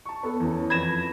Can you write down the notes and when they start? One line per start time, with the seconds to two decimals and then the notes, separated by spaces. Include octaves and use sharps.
0.06 A5 C#6
0.23 B3 A4
0.40 E2 E3 C#4
0.70 F2 B4 B5 G#6 A#6 E7